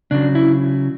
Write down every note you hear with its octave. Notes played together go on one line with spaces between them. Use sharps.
C#3 F#3 D4
E4